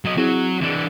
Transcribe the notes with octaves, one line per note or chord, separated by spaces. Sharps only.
F#3 D#5
F#3 C4 E4 G#4
E3 D4